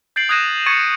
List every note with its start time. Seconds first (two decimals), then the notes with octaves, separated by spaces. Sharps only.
0.16 G6 A6 C7 D7 F#7
0.29 D#6 F#6 G#6 A#6 D#7 E7
0.66 C#6 G#6 A6 C#7 D#7